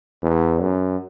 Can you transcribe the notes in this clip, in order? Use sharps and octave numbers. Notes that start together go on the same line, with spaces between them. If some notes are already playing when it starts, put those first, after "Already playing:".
E2
F#2